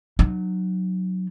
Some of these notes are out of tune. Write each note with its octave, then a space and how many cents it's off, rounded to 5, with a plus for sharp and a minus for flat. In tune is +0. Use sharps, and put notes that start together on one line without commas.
F#3 +0 D#4 -40